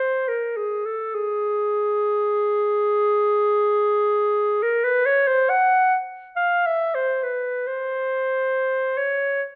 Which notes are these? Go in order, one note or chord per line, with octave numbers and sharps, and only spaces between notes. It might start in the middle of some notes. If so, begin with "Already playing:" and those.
Already playing: C5
A#4
G#4
A4
G#4
A#4
B4
C#5
C5
F#5
F5
E5
C5
B4
C5
C#5